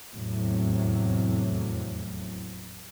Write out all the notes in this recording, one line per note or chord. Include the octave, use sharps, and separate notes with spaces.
F1 E2 A2 C3 F#3